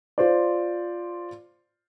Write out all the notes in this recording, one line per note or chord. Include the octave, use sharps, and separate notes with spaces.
F4 C5 D5